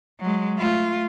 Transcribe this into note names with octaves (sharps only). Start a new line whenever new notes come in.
F#3 G#3
A3 F4